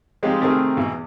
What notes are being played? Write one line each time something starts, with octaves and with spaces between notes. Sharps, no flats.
F3 G#3 C4 D#4 G4
C3 D#3 A3 C4 G#4 A#4
G#2 B2 E3
E2